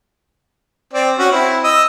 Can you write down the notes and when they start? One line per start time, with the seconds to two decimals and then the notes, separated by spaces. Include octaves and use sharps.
0.94 C4 D5
1.18 C#4 F#4
1.32 C4 E4
1.63 D#5 E6